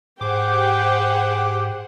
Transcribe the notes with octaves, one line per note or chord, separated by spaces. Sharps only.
G#2 G4 G#4 C5 F#5 G5 D6